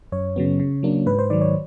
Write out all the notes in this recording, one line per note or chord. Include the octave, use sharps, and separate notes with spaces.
F#2 C#5
C#3 F#3 B3
C#3
F#3 A#3 D4
G#2 B4
C5
D#3 F#3 D5
C#5